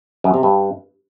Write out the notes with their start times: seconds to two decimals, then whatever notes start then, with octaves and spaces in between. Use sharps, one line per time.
0.24 F#2
0.34 C3
0.43 G2